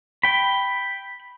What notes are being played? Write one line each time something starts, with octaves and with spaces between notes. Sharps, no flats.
G5 B5